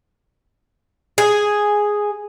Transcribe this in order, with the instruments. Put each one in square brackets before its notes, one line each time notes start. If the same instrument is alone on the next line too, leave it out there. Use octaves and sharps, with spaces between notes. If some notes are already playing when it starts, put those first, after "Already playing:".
[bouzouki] G#4